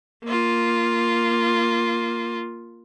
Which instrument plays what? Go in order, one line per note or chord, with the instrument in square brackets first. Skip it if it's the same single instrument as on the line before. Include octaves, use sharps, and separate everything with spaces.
[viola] A#3 F4